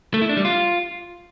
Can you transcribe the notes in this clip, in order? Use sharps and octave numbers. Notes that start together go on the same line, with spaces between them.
A3
E4
D4
G3
F4